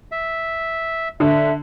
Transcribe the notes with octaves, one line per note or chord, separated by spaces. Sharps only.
E5
D3 E5